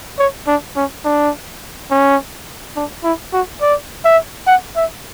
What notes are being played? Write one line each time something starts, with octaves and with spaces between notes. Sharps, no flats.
C#5
D4
C#4
D4
C#4
D4
E4
F#4
D5
E5
F#5
E5